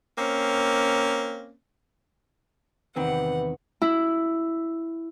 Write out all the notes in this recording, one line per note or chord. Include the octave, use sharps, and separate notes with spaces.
A#3 C4 C#4
E2 C3 D#3 C4 B4 F#5
E4